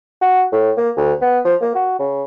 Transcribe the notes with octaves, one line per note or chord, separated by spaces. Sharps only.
F#4
A2
A#3
D2
B3
F3
A#3
F#4
C#3